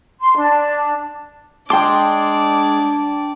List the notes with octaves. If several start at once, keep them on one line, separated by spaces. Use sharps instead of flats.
C6
D4
G#3 D4 D5 G5 A5 C6 D6